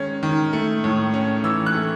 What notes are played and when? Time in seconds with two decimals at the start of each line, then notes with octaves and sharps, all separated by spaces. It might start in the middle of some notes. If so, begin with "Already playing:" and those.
Already playing: D#3 G#3 C#4
0.23 D#3
0.53 A3
0.84 A2
1.14 C#4
1.44 E3 E6
1.66 F#6
1.74 A3